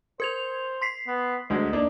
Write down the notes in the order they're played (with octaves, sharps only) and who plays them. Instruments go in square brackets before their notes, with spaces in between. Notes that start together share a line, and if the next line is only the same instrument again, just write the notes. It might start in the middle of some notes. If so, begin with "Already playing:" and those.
[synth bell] A#4 G#6 F7 [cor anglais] C5
[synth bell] C6 B6 C7
[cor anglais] B3
[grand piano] D2 F#3 G#3 [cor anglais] D#5
[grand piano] A#3 D4 D#4